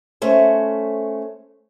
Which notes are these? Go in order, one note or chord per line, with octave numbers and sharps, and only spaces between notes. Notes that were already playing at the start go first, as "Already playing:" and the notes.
A3 C#4 C5